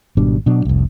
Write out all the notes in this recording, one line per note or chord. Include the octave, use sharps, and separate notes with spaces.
G#1 B2 G3 D4
B2 F#3 D4
F1 C2